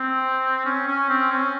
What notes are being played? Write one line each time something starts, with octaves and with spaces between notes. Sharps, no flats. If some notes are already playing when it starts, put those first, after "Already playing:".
Already playing: C4
C#4
C#4
C4
C#4